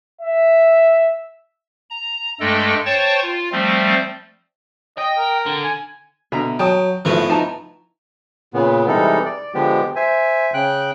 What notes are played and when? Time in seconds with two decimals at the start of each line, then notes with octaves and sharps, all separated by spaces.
0.21 E5
1.90 A#5
2.40 G2 G#3 A3 A4 D#5 G5
2.86 C5 C#5 G5 A5 C#6 A6
3.22 F4
3.52 F3 G3 A3 C4
4.98 D#5 G5
5.18 A#4
5.46 D3
5.64 G#5
6.32 B2 D3 E5 A#5
6.59 F#3 G5 A5 D#6
7.05 G#1 F3 A3 B3 E4 F#4
7.30 D#4 E4 A5 A#5
8.54 A#2 C#3 B3
8.88 C3 E3 G3 G#3 D#4 A4
9.25 D5
9.54 D3 F3 G#3 B3 G4
9.96 C5 E5 G#5
10.54 C#3 G5 F#6